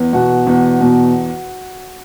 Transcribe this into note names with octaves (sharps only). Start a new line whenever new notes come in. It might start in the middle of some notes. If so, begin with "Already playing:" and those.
Already playing: E2 B3
B2 F#4
E2
B2